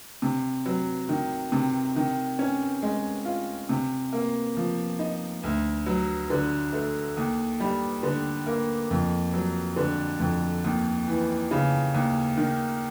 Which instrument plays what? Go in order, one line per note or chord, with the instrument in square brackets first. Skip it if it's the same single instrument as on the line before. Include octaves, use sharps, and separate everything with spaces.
[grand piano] C3
F#3
D#3
C3
D#3
C#4
G#3
F4
C3
A#3
F3
D#4
D2
F#3
D3
A3
D#2
G3
D3
A#3
F2
F#3
D3
F2
D#2
E3
C#3
D#2
D#3